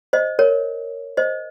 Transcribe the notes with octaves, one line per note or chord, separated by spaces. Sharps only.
C5 D#5
A#4 C#5
C5 D#5